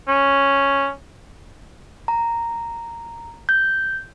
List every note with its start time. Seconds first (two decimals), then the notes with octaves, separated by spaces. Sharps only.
0.08 C#4
2.08 A#5
3.49 G6